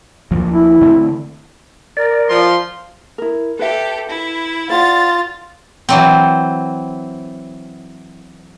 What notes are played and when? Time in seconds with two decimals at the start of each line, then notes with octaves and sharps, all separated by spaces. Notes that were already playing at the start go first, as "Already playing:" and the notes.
0.31 D2 F3 A#3
0.51 E4
0.82 D3 A3 C4
1.97 A#4 D5
2.30 F3 C6
3.18 E4 A#4
3.59 G4 A4 B4 E5
4.08 E4
4.70 F4 C5 D5 F#5 A6
5.89 E3 F#3 C4